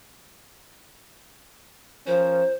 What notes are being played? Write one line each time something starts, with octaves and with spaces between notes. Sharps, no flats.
F3 C#4 A#4 C5